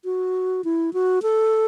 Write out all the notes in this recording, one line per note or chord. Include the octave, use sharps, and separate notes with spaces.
F#4
E4
F#4
A4